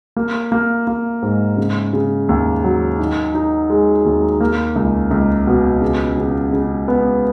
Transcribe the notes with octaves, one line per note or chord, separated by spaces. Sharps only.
A#3
A#3
A#3
G#2
C#3
C#3
D#2
F#3
D#4
D#4
G#3
D#2
A#3
C#2
C#2
B2
C#3
C#3
C#3
B3